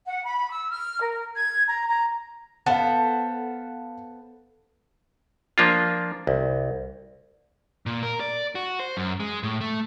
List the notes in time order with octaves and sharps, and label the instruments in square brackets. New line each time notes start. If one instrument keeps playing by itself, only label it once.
[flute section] F#5
B5
E6
F6
A#4
G#6
A#5
A#5
[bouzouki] B3 A4 C5 [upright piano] F5 F#5
[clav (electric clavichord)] F3 A#3 D4 F4
C2
[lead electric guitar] A#2
A#4
D5
F#4
C5
F#2
G#3
A2
A3